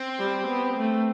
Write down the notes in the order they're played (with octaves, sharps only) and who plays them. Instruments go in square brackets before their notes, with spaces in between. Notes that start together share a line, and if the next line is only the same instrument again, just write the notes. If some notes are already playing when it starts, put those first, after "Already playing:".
Already playing: [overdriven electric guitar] C4
[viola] G3
B3
A3